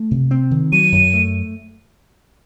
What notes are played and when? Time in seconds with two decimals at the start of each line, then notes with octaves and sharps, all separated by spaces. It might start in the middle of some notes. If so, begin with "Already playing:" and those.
Already playing: A3
0.11 C3
0.31 C4
0.51 D#3
0.72 F#3 D#7
0.92 F#2
1.14 A3